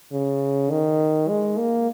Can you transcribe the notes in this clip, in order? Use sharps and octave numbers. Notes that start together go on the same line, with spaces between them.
C#3
D#3
G#3
A#3